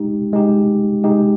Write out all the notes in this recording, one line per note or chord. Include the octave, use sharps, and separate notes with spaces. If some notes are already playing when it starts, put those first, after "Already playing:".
Already playing: G#3 D#4 G4
G#3 D#4 G4
G#3 D#4 G4